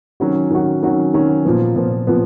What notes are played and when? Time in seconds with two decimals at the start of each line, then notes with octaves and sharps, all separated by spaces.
0.20 D#3 F#3 C#4 F#4
0.51 D#3 F#3 C#4 F#4
0.83 D#3 F#3 C#4 F#4
1.14 D#3 F#3 C#4 F#4
1.45 A#2 F3 B3
1.76 A#2 F3 B3
2.07 A#2 F3 B3